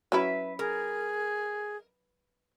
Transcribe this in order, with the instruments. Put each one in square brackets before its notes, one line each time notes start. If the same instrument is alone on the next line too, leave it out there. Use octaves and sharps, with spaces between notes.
[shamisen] F#3 C#4 E4 [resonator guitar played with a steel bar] B4 E5
[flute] G#4 [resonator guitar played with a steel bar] A#4